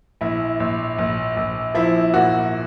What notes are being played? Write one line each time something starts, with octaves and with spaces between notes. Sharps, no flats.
A#1 E4
A#1
A#1
A#1
F3 E4
A#2 F#4